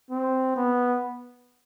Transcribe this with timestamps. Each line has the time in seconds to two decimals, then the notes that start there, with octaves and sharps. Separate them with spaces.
0.10 C4
0.56 B3